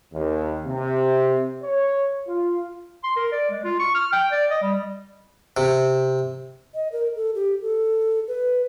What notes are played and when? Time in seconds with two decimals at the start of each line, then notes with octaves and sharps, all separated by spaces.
0.12 D#2
0.67 C3
1.63 C#5
2.27 F4
3.04 C6
3.16 A#4
3.32 D5
3.51 G#3
3.64 F4
3.79 C#6
3.95 F6
4.12 G5
4.31 D5
4.50 D#5
4.62 G3
5.57 C3
6.74 D#5
6.92 A#4
7.16 A4
7.35 G4
7.61 A4
8.28 B4